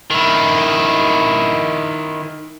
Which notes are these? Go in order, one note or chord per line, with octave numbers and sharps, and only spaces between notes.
D#3 E4